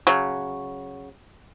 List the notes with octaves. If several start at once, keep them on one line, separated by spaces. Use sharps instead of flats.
C#3 F#3